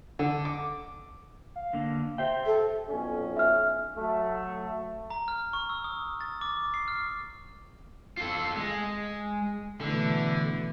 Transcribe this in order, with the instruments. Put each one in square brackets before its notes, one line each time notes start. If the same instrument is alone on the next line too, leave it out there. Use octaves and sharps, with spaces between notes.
[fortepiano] D3
D6
[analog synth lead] F5
[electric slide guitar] D3 A#3
[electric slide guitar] G4 C5 G5 [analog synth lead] E5
[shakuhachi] A4
[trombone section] B1 F2 C#4
[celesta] E5 F6
[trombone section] F#3 A3
[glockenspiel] A#5
F6
C#6
E6
D#6
A6
D6
C7
F6
[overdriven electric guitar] F4 A4
G#3
[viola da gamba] B2 E3 A3 [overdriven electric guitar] D3